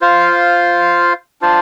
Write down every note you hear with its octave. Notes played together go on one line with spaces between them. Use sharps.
F4 C5 F5
D4 F4 C5